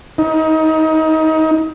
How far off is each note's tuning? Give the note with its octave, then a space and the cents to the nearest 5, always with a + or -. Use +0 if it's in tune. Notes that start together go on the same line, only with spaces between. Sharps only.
D#4 +25